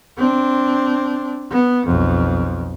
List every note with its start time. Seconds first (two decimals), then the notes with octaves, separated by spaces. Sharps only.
0.17 C4 D4
1.50 B3
1.86 B1 F2